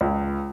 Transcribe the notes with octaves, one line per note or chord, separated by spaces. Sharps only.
C#2